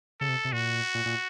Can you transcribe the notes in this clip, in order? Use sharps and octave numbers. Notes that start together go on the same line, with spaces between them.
C#3 A4
C3
C3
A#2 F#4
A#2
A#2